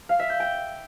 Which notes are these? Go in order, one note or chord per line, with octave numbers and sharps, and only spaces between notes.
F5
E5
G6
G5